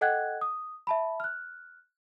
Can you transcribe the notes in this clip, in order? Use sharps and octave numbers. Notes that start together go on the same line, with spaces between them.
A4 D#5 F#5 G5 F#6 G#6
D#6
E5 A5 B5
F6 F#6